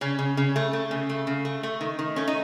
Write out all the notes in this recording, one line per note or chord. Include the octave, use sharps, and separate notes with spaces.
C#3 C#4
C#3
C#3
A3
A3
C#3
A3
C#3
A3
A3
D#3
D#3
A3 C#4
D#4